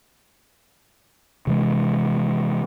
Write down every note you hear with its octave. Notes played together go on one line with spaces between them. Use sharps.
C3 E3 G#3